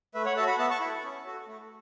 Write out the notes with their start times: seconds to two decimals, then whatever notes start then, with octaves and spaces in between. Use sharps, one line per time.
0.14 A3 B4 E5
0.25 C#5 F#5
0.37 F#4 A4 E5 A5
0.47 F#5 B5
0.58 B3 E5 A5
0.70 A5 C#6
0.80 E4 F#5 B5
0.84 A4
1.04 C#4
1.26 F#4 A4
1.47 A3